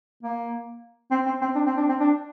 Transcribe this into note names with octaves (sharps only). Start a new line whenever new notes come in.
A#3
C4
C4
C4
D4
C4
D4
C4
D4